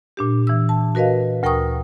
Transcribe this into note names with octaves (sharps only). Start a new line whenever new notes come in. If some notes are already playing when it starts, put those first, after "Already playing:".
A#2 D4 G4
E3 E6
A5
F#4 A#4 B4 D#5 F5
D2 A#4 G5 A#5 C#6 D#6